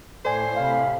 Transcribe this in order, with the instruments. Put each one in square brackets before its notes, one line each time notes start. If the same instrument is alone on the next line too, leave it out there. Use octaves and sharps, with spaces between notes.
[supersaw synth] A2 C7 [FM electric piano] A4 D5 G#5 [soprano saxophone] C5
[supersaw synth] A2 C3 B5 [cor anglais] F5